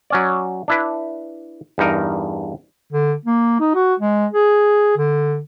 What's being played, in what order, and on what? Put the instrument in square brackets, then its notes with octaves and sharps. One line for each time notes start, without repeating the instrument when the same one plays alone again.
[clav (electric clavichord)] F#3 C#4 D5
D4 E4 B4
E2 G2 D#4 A#4
[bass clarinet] D3
A#3
D#4
F#4
G#3
G#4
D3